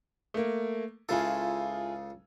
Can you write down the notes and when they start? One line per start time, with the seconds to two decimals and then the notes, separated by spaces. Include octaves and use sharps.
0.34 A3 A#3
1.09 C#2 C#3 E4 F4 G#4 A4